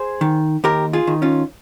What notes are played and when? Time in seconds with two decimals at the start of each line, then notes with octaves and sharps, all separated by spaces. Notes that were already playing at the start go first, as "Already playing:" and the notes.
Already playing: G#4 C5
0.21 D#3
0.64 D#2 G4 A#4
0.93 F4 G#4
1.07 D#3
1.22 C#4 F4